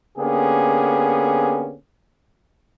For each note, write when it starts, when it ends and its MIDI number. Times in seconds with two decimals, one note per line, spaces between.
0.18 1.75 50
0.18 1.75 58
0.18 1.75 59
0.18 1.75 61
0.18 1.75 67
0.18 1.75 68